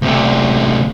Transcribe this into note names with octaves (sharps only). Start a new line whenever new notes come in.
D2 C3